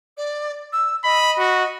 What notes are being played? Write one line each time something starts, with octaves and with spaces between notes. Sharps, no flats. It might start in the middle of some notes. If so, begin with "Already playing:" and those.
D5
E6
D#5 B5
F#4